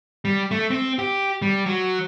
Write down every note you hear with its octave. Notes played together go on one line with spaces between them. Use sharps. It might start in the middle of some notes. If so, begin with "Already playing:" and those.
G3
A3
C4
G4
G3
F#3